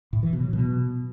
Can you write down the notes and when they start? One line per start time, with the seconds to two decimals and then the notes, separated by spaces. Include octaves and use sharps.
0.13 A2
0.23 E3
0.33 B2
0.43 F#3
0.53 B2